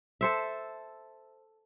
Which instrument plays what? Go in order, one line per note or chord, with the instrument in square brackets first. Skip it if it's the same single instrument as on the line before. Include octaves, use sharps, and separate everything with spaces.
[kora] A4 C5 E5